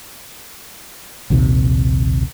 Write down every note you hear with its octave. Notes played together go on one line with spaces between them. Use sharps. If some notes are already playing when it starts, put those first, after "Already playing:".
A#1 D#2 C3 D#3